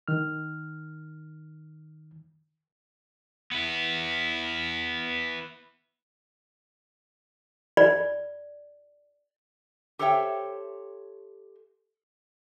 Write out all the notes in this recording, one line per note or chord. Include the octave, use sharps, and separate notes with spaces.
D#3 F6
B3 E4
D5
G4 A4 C5 C#5 E5 G5